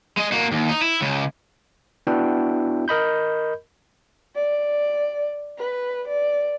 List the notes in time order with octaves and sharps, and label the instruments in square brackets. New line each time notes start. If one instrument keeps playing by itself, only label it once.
[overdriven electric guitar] G#3 D#5
A#3 F#4
D#2
D#4
E4
C#2 C#3
[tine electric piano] B3 D4 E4 F#4 E5 G5
A#4 D#5 B5 G6
[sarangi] D5
B4
D5